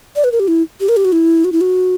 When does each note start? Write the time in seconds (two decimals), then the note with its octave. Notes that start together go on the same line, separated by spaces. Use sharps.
0.16 D5
0.24 B4
0.32 A#4
0.40 G4
0.48 E4
0.80 G4
0.89 A#4
0.97 G4
1.05 F#4
1.12 E4
1.45 F#4
1.52 E4
1.61 F#4